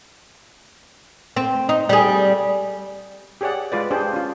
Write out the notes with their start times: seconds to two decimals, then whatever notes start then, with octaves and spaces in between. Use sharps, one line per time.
1.36 C4
1.69 D#4
1.89 G3 G#4
3.41 G4 G#4 C#5 D5 F#5
3.72 G#3 F4 B4 D5
3.91 D4 G4 G#4 C5
4.13 C#4 F4